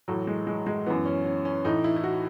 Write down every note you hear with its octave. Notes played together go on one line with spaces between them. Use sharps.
A2 E3 F#3
G#3
G#3
G#3
F#2 E3 B3
C#4
C#4
C#4
A2 E3 D#4
E4
E4
F#4